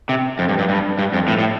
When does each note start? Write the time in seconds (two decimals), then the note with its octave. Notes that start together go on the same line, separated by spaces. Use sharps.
0.09 C3
0.39 F2
0.49 G2
0.59 G2
0.69 G2
0.99 G2
1.14 F2
1.28 A2
1.39 A2